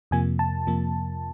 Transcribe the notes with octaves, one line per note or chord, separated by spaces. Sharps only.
F2 C3 F3 A#3 G#5
A5
F2 C3 F3 A#3